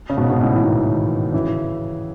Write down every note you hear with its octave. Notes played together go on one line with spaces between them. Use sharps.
C#3
G#2 B2
B2
A2 C#3
E3
B2 D#3
C#3 E3